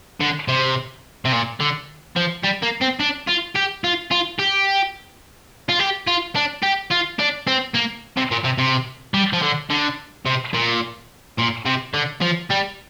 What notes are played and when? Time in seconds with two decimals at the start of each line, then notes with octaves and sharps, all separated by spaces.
0.20 D3
0.48 C3
1.25 C3
1.33 A#2
1.60 D3
2.16 F3
2.43 G3
2.62 A#3
2.81 C4
3.00 D4
3.27 F4
3.55 G4
3.84 F4
4.12 F4
4.39 G4
5.69 F4
5.79 G4
6.07 F4
6.35 D4
6.63 G4
6.91 F4
7.19 D4
7.47 C4
7.74 A#3
8.17 C3
8.31 A#2
8.44 C3
8.58 C3
9.14 G3
9.33 F3
9.42 D3
9.70 D3
10.26 C3
10.54 A#2
11.38 A#2
11.65 C3
11.94 D3
12.21 F3
12.50 G3